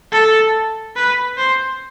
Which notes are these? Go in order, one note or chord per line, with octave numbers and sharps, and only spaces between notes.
A4
B4
C5